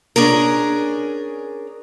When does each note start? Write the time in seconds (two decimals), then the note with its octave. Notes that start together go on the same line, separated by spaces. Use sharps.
0.16 C#4 D4 G#4 A#4